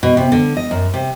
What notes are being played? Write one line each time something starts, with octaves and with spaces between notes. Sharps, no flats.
B2
C3
D3
D#5
F#2
C3